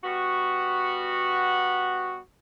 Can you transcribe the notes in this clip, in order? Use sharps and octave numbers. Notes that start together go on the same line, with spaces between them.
G3 B3 F#4